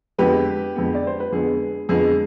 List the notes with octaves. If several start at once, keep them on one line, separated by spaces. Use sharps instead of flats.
F2 D3 G#3 B3 G4 B4
F2 D3 G#3 B3
D5
C5
B4
F2 D3 G#3 B3 G#4
F2 D3 G#3 B3 G#4